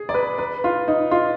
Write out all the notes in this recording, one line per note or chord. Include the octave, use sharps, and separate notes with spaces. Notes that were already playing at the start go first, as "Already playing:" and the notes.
Already playing: G#4
D5
B4
B4
F4
D#4
F4